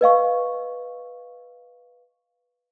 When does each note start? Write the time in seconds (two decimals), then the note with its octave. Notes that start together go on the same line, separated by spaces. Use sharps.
0.01 B4 D#5 F5 C#6